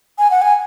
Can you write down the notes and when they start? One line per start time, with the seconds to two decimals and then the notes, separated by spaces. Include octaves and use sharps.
0.19 G#5
0.31 F#5
0.42 G#5